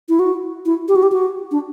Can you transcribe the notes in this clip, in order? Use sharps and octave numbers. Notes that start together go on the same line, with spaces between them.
E4
F#4
E4
G4
F#4
G4
F#4
D4